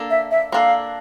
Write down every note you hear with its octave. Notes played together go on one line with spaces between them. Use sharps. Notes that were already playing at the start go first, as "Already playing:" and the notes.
Already playing: A#3 D4 A4
E5
E5
A#3 D4 A4 F5